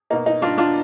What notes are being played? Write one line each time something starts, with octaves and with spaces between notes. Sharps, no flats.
B2 A#3 D#4
D#4
D4 F4
D4 F4